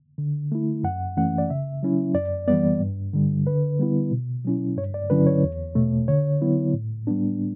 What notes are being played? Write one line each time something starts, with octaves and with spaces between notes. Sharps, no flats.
D3
A3 E4
F#2 F#5
E3 A3 C#4 F#5
D5
C#3 E5
F#3 C#4 E4
F#2 D5
E3 G3 B3 D5
G2
D3 G3
D3 B4
G3 B3 E4
B2
F#3 C#4 E4
G2 C#5
D5
D3 F#3 C#4 E4 B4
C#5
E2
B2 A3
D3 C#5
F#3 B3 E4
A2
G3 B3 D4